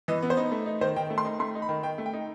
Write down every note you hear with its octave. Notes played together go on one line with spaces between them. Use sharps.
E3 D#5
B3
C5
D#4
A3
D#4
D#3 C5
D#3 G5
A3
C6
D#4
A3 C6
D#4
B5
D#3
D#3 G5
A3
G5
D#4